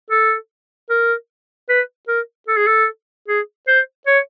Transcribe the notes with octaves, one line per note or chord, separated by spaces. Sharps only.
A4
A#4
B4
A#4
A4
G#4
A4
G#4
C5
C#5